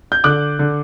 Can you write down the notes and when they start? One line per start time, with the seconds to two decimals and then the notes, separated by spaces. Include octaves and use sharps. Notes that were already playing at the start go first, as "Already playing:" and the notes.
0.12 G6
0.24 D3 D6 F#6
0.59 D3